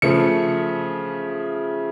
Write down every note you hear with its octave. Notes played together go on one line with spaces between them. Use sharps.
C#3 F3 A3 C#7